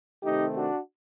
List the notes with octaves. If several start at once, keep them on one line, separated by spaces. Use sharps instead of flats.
C3 D#3 A3 C4 D#4 G4
D4 F#4